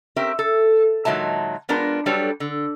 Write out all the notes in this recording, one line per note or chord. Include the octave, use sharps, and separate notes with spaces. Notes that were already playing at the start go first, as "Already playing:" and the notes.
C4 C#4 G4 A#4 E5
A4
A#2 D#3 F#3 G#3 E5 A5
G#3 B3 D4 F4 A#4
F#3 G3 D4 A4 B4 C#5
D3